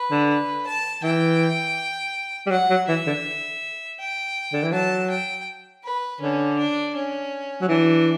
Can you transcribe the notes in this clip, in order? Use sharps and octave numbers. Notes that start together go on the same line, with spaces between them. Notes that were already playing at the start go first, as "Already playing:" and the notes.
Already playing: B4
D3
B4
A5
E3 G5
G3
F#3 F#5
F#3
E3 E5
D3
G5
D3
E3
F#3 A5
G5
B4
D3 C#4
D4
C#4
F#3
E3 D4